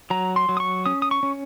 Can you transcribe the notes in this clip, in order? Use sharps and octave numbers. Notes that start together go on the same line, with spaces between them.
F#3 A#5
C6
F#3
D#6
C#6
C#4 D#6
D#6
C#6
C#4